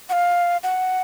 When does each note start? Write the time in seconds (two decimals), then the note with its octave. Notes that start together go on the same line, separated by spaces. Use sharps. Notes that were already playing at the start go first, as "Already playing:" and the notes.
0.09 F#5
0.13 F5
0.63 F#5